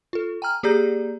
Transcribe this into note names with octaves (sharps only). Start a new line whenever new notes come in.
F4 A4
G5 G#5 A#5 F6
A#3 G4 G#4 D5 A#5 G6